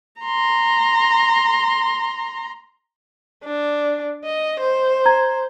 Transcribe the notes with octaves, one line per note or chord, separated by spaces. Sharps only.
A#5 C6
D4
D#5
C5
A#5 G#6